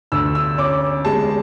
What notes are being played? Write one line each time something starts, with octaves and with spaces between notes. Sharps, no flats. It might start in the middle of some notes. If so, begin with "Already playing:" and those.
D2 E6
E6
C#4 D6
G#3 A5